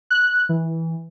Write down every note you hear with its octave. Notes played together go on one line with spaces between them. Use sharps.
F#6
E3